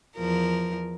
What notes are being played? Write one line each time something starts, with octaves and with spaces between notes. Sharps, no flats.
E2 F3 A#4